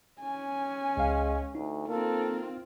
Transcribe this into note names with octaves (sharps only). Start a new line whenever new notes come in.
C#4 G#5
C#2 G#3 F5
D2 D#4
A#3 C4 F4 A4